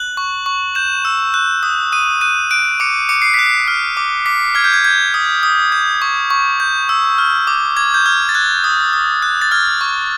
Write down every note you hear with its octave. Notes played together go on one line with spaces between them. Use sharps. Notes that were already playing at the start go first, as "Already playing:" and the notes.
Already playing: F#6 F#7
C#6
C#6
G6 E7
E6
F#6
D#6
D#6 D#7
F#6 D#7
F#6 D7
D6 C#7
D6 C#7
C7
F#6 B6
C7
F6
D6
D6 B6
F6 G#6
G6
G#6
G6 G#6
D#6
D#6
G6
C#6
C#6
G6
E6
F6
D6
D6 G#6
G6
F6 G#6
A6
F#6 G#6
D#6
D#6
F#6
A6
F6 G#6
C#6